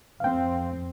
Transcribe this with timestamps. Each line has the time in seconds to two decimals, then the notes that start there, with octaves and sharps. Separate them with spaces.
0.20 F2 C4 F5 G5